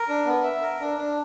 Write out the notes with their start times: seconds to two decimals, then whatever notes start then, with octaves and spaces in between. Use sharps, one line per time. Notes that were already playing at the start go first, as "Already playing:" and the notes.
Already playing: A#4
0.09 D4
0.26 B3
0.43 E5
0.62 A#4
0.80 D4
0.98 D4